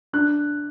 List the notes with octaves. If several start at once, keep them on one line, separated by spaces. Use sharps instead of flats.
D4 F#6